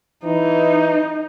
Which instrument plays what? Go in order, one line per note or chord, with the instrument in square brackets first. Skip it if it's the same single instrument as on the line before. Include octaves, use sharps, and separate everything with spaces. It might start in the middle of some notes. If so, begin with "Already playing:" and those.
[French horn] E3 [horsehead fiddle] D#4